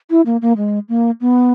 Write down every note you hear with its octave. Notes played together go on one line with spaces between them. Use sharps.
E4
A#3
A#3
G#3
A#3
B3